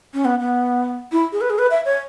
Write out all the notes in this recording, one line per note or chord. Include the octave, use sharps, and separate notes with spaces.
C#4
B3
B3
E4
G#4
B4
G#4
B4
E5
C#5